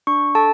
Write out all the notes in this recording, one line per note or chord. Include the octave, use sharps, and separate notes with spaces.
D4 C#6
A4 A5